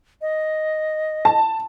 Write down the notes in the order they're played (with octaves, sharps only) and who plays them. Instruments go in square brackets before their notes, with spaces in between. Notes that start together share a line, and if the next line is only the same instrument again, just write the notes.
[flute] D#5
[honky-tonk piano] A5